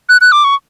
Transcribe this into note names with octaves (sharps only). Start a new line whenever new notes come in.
F#6
F#6
D6
C#6